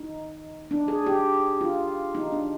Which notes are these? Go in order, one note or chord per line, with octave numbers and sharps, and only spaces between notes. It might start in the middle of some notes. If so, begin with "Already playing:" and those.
Already playing: D#4
D4
G#4
G4
F4
D#4
D4